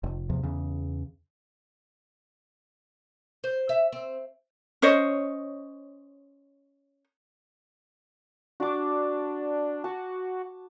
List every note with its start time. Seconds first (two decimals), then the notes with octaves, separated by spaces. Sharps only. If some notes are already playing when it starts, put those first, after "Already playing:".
0.04 F1
0.30 E2 C3 F3
0.43 E2 C#3
3.44 C5
3.69 E5
3.92 C4
4.82 C#4 C5 C#5 D#5
8.60 D4 F#4 D6
9.84 F#4 A5